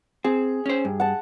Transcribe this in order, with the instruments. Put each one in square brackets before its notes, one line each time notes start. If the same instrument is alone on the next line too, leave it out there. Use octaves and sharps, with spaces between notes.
[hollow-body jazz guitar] C4 [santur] G#4
[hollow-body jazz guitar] C#4 C5
G2
[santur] F#5 A5